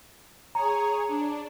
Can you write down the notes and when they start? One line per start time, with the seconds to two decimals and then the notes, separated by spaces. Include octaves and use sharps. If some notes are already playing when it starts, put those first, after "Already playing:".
0.55 G#4 C#5 A#5
1.08 D4